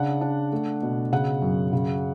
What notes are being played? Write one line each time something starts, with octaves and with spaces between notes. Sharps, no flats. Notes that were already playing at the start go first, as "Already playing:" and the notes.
Already playing: C#3 D4 F#5
D4
A3
B2
C#3 F#5
F#2
C#3